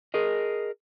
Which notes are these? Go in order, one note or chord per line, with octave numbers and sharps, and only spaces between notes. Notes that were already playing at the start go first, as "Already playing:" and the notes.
G#4 A#4 D#5